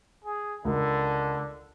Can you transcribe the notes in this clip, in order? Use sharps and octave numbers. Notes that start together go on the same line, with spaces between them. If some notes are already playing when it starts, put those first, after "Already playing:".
G#4
C#2 D3 A#4